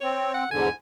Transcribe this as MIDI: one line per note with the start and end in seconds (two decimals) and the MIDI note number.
0.01 0.44 60
0.01 0.30 73
0.34 0.48 78
0.51 0.69 40
0.51 0.69 44
0.51 0.69 50
0.51 0.72 80